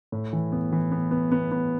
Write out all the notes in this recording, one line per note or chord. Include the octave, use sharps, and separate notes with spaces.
A2
E3
B3
E3
B3
B3
B3
B3